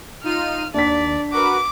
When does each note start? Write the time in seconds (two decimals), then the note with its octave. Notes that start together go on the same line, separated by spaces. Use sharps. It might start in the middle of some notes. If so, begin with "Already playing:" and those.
0.24 D#4 F4 F6 D#7
0.74 D#2 D4 D5 B6
1.32 F#4 A#4 B4 D6